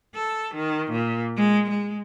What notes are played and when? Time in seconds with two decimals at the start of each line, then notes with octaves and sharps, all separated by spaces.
0.15 A4
0.55 D#3
0.91 A#2
1.36 G#3
1.70 G#3